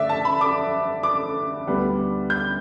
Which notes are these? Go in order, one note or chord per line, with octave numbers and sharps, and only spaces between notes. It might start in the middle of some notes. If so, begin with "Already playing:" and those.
Already playing: D3 A3 D5 E5
A5
B5
D6
D6
D2 D3 G3 B3
G6